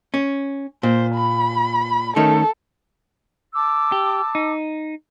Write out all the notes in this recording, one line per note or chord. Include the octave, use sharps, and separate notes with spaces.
C#4
A#2 C5
B5
D#3 A3 C#4 A4
A5 D6 E6
G4
D#4